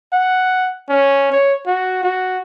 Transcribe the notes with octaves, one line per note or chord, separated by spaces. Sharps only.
F#5
C#4
C#5
F#4
F#4